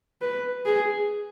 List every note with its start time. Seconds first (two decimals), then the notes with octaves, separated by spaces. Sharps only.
0.21 B4
0.66 G#4